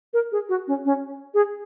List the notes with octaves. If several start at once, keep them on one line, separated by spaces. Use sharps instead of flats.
A#4
G#4
F#4
C#4
C#4
G#4